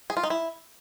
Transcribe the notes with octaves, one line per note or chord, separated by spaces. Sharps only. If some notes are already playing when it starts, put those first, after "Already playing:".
G#4
F4
D#4
E4